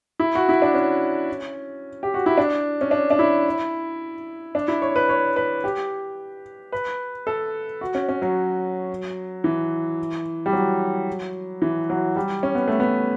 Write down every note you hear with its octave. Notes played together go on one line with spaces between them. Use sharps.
E4
F#4
E4
D4
C#4
G4
F#4
E4
D4
C#4
D4
D4
E4
D4
E4
C#5
B4
C#5
B4
G4
B4
A4
F#4
C#4
C#4
F#3
E3
G3
F#3
E3
F#3
G3
C#4
B3
A3
B3